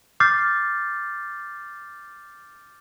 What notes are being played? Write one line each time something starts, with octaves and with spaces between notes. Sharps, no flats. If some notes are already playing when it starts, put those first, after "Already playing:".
D6 F6 G6 A6 C7